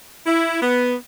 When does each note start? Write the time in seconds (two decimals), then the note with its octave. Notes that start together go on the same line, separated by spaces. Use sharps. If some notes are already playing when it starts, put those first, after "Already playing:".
0.25 E4
0.61 B3